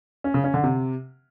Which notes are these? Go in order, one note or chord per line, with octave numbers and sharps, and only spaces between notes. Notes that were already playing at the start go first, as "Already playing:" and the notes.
C#4
C#3
C#4
D3
C3